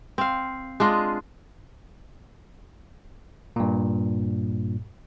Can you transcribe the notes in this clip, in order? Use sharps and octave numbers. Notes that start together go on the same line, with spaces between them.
C4 F5
G#3 D4 F4 D#5
G2 A#2